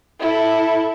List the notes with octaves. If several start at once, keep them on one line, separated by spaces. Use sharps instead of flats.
E4 A4